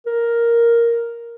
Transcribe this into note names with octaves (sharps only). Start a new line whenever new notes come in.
A#4